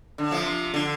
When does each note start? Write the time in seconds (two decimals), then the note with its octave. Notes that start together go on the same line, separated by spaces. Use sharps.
0.18 D3
0.31 C3 F3
0.74 D3